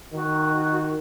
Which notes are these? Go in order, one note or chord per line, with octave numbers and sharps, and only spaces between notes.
D#3 F#4